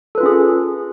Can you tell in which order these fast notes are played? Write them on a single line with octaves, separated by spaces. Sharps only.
A4 B4 F4 C#4 G#4